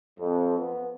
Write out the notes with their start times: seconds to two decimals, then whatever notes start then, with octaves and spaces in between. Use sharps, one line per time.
0.20 F2
0.59 B3